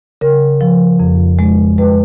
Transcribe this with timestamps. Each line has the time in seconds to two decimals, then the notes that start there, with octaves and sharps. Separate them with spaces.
0.21 C#3 A#4
0.61 F3
1.00 F2
1.39 G#3
1.78 G#3 B4